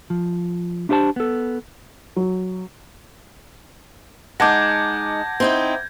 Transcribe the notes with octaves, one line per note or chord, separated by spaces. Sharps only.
F3
D4 E4 G4 C5 A5
B3 A4
F#3
G#3 D#4 F#5 A5 D6 G6 G#6 A#6
C4 D#4 E4